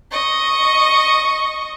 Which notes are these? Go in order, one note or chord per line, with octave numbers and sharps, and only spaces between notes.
D#5 C#6